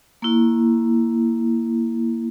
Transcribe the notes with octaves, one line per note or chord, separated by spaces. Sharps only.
A#3 E4